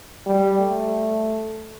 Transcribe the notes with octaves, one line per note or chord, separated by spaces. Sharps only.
G3
A3